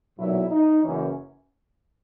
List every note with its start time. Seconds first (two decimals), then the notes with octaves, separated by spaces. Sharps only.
0.19 B1 A#2 F#3 E4
0.51 D#4
0.84 F#1 F#2 E3 C#4